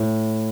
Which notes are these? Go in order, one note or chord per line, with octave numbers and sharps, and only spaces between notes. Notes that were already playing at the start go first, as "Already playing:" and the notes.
Already playing: A2